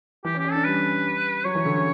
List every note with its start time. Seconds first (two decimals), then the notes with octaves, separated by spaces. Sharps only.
0.25 E3 G4
0.35 C#4
0.38 G4
0.45 C#4
0.51 D4 A4
0.64 G3 B4
1.45 F#3 C#5
1.55 E3
1.65 D3
1.75 C#3